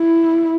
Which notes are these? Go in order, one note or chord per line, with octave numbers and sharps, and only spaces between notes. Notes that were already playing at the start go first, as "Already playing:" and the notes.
Already playing: E4